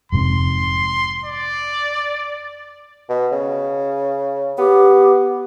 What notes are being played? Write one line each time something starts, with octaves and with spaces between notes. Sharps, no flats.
F1 G#2 C3 C6
D5
B2
C#3
B3 G4